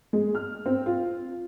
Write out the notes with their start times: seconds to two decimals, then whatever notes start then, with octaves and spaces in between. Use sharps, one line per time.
0.13 G#3
0.35 F6
0.66 C4
0.86 F4